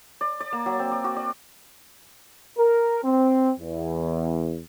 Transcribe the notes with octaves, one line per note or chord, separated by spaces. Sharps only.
D5
D5
A#3
F#3
C4
D5
F#4
D5
A#4
C4
E2